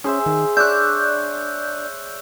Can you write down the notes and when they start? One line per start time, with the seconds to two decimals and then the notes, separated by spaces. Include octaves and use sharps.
0.04 C#4 G#4 C5 E5
0.26 D#3
0.57 D4 C#5 D5 E5 F#6 G6